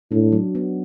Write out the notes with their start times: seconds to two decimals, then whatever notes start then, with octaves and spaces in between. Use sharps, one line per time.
0.11 A2 D4
0.32 F#3
0.55 B3